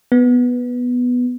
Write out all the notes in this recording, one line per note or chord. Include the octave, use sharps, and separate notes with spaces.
B3